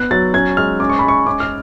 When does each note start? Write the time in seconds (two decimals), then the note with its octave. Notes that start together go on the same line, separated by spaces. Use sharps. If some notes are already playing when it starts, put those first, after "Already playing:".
Already playing: B3 F#6
0.11 F#3 A6
0.34 C#4 G#6
0.57 G#3 F6
0.80 C#4 D6
0.89 C#6
0.99 G#3 B5
1.08 C#6
1.27 C#4 D6
1.40 F6